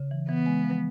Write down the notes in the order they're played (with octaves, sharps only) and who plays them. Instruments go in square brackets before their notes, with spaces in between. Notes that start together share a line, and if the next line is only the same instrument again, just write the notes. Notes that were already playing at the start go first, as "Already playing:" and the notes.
Already playing: [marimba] C#3
E3
[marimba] E3 [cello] B3
[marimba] G#3
F3